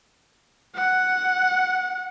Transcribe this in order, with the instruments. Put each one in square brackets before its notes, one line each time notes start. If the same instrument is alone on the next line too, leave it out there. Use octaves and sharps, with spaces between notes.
[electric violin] F#5